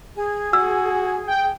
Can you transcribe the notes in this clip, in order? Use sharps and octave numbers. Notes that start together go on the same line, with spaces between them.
G#4
F#4 E6
G5